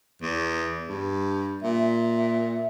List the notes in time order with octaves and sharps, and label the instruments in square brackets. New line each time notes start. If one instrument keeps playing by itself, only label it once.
[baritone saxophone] E2
G2
[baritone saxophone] A#2 [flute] E5